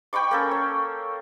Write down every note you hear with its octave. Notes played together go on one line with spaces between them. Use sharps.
G5 B5 C#6 D6
A#3 C#4 A4
C#5